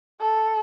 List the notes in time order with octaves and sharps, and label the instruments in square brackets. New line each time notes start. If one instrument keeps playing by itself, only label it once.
[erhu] A4